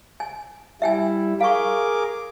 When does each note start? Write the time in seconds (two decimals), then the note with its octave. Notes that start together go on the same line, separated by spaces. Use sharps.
0.20 G#5
0.82 G3 E4 E5 G5 G#5
1.41 G#4 A#4 F5 C#6 D6